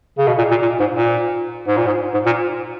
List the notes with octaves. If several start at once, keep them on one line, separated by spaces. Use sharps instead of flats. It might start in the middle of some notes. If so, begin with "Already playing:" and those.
C#3
B2
A#2
A#2
A#2
G#2
A#2
G#2
A#2
G#2
G#2
A#2